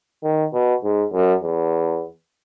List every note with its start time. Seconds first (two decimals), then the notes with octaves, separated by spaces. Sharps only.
0.24 D#3
0.53 B2
0.83 G#2
1.13 F#2
1.43 E2